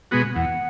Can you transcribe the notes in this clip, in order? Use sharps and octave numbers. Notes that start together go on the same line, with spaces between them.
B2 G#3 B3 F#4
E2 F#5